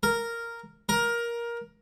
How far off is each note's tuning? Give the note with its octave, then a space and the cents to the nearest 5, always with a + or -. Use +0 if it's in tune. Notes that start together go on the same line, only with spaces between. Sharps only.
A#4 -5
A#4 +15